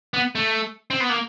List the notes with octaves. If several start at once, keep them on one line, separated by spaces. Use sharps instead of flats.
B3
A3
C4
B3
A#3